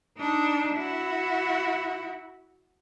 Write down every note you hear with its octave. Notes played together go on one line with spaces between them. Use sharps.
D4 D#4
E4 F#4